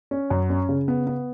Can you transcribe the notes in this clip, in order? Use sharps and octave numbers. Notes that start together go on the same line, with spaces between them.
C#4
F#2
C#4
C#3
B3
B3